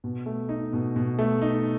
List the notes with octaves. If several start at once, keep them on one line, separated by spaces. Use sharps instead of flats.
B2
A3
D#4
B2
B2
A3
D#4